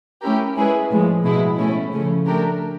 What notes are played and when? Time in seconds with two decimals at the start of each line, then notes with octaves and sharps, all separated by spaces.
0.22 A3 C#4 E4 G4 A#4
0.56 G#3 C#4 E4 G#4 B4
0.91 A2 F3 G#3
1.24 B2 G#3 B3 E4
1.58 A3 C#4 E4
1.93 C#3 F3 A3 C#4
2.26 A3 D4 G4 A#4